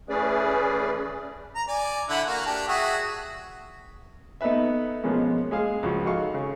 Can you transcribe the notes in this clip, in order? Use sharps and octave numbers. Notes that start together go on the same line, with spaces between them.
E3 A3 C#4 G#4 B4 D5
A#5
D5 G#5
D3 E4 F#5
A#3 F#4
D4 G4
F#4 G#4 E5
B3 D#4 A4 B4 E5
B2 F3 G#3 A#3 B3 C#4
G#3 G#4 F5
C#2 F3 F#4 C#6
D#4 F#4 A4 F5 C#6
C#3